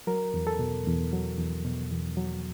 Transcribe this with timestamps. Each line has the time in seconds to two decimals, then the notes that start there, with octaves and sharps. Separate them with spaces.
0.07 F#3 A#4
0.34 E2
0.47 A4
0.59 B2
0.86 E2
1.13 F#3
1.38 E2
1.65 B2
1.91 E2
2.17 F#3